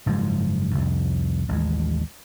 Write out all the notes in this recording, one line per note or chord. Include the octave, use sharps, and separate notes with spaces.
F#1 G#2 F3 G#3
C2 F2
A1 D#2 G#3